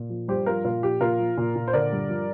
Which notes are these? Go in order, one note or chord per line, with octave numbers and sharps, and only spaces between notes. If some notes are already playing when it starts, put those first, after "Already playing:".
Already playing: A#2
F3
G2 G4 C5
F3 F4 A#4
A#2 F4 A#4
F3 G4
A#2 F4 A#4
F3
A#2
A#2
C5
D3 A#4 D5
G2
F3